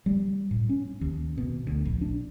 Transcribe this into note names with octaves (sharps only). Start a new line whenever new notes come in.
G3
A2
C#4
D#2
B2
D2
A#1
D4